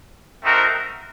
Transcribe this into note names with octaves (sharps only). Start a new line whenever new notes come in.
A3 C4 D#4 F#4 A#4